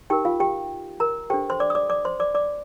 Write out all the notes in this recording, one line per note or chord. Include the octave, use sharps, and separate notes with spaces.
D#4 G4 A#4 G5
F4 F5
G4 G5
A#4 A#5
D4 G4 A4 C5 G5
C5 C6
D5 D6
D#6
D5 D6
D5 D6
C5 C6
D5 D6
D5 D6